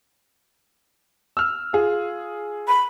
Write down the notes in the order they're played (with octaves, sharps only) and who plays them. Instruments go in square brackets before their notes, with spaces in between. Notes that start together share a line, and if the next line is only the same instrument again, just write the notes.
[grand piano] E6 F6
F4 G#4
[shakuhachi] B5